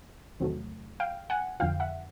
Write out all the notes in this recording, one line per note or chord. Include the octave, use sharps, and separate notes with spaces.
E2 C3 D#3 F#3 A3
F5 G5
F#5 G#5
F2 D3 F3 F5 G5
E5 F#5